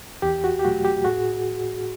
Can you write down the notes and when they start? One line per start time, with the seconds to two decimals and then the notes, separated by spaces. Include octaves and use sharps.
0.22 E2 G4
0.44 F#4
0.59 G4
0.65 B2 F#3 A3 F#4
0.85 G4
1.05 A2 F#4 G#4